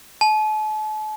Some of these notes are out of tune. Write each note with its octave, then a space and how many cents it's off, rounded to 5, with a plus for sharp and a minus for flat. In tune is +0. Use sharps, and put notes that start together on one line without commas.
A5 -40